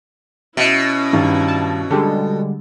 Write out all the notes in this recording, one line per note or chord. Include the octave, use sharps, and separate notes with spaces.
B2 C#4 E4 E5
G2 D#3
A5
D3 G3 G#3 A4